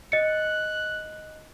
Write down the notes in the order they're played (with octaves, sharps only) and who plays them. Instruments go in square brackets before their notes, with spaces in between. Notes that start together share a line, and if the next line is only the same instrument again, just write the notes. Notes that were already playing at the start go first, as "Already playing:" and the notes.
[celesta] D#5 C#7 [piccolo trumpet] F#6